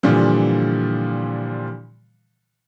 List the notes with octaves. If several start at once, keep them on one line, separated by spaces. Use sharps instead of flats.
A#2 D3 E3 F3 G3